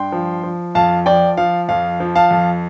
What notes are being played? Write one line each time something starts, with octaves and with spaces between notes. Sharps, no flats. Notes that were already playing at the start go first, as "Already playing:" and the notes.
Already playing: G2 G5 C6
F3
F3
F2 F5 A5
F3 D5 G5
F3 F5
F2 F5
F3
F5 A5
F2